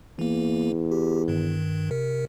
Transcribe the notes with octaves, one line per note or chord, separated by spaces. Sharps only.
E2 E3 A#3
G4
G2 D#3
C3 A#4